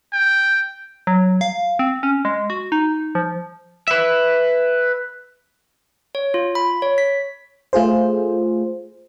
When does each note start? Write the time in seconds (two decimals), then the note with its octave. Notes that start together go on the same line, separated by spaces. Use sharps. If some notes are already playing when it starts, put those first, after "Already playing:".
0.13 G5
1.07 F#3
1.41 F5
1.79 C4
2.03 C#4
2.25 G#3
2.50 F#4
2.72 D#4
3.15 F3
3.88 B4 E5
6.15 C#5
6.34 F4
6.55 B5
6.82 C#5
6.98 B6
7.73 A3 F4 G#4 C5